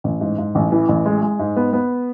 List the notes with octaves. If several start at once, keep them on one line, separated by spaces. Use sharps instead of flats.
A1
G#2
G#2
A1
E3
A1
G#3
G#3
G#2
B3
B3